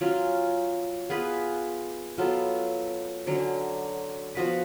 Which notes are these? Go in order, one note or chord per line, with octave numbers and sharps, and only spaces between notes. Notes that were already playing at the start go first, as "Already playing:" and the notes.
F#3 C#4 F4
B3 F4 G#4 B4
F#3 B3 F4 A4
D3 F#3 C#4
F3 B3 F#4 B4